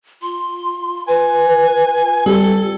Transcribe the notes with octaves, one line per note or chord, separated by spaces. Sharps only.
F4 C6
B4 G#5
G3 A4